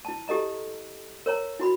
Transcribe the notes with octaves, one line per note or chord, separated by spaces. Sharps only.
E4 A5
E4 G4 A4 D#5 A#5
A#4 C#5 A#5
E4 F#4 B5